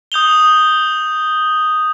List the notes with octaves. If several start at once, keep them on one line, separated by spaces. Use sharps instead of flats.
D#6 G6 F7 G7